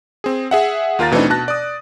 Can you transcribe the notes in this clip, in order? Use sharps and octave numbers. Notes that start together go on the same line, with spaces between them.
C4 G#4
G#4 E5 F#5
D#2 F4 A#4 F5 A#5 A6
B2 E3 A3 C4 D4 D#4
B2 A5 F#6 A#6
D5 D#6